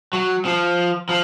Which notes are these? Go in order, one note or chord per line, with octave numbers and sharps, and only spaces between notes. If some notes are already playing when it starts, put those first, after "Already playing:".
F#3
F3
F3